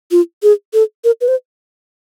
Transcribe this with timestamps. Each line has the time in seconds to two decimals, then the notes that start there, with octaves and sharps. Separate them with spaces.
0.11 F4
0.43 G#4
0.74 A4
1.04 A#4
1.21 B4
1.28 C5